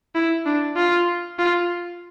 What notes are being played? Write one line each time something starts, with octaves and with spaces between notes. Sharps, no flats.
E4
D4
F4
F4